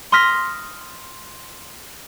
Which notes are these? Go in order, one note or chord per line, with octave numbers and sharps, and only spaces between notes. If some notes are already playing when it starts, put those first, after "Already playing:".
C6 D#6 F6 A#6 B6